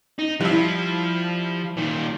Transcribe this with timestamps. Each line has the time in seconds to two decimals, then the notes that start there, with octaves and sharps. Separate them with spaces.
0.19 D#4
0.41 F3 G3 E4
1.77 A#2 D#3